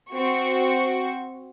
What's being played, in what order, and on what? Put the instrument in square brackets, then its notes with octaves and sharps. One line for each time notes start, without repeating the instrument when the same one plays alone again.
[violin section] C4 F#4 C#6 C#7